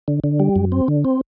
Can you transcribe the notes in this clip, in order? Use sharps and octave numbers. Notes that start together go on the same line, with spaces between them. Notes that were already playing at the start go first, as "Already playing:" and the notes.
D3
D3
G3
F#2
C4
D3
C4